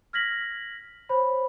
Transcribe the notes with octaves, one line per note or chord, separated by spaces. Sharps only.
F6 G#6 A#6 B6 F#7
C5 C#5 B5